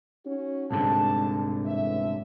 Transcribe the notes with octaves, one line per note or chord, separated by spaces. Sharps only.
C#4 D#4 F#4
C2 G#2 D3 A5
A1 E5